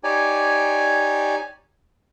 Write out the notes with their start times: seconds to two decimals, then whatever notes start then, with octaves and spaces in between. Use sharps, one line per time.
0.04 D#4 G4 C#5 D5 G#5